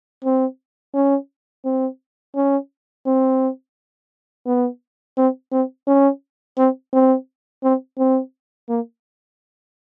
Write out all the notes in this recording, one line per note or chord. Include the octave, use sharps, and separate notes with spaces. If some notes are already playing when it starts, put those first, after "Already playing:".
C4
C#4
C4
C#4
C4
B3
C4
C4
C#4
C4
C4
C4
C4
A#3